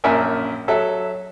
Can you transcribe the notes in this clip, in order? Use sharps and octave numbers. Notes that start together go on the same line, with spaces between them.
A#1 F#2 A#4 E5 G#5
F#3 A4 E5